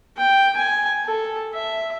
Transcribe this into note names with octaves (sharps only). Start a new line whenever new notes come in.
G5
G#5
A4
E5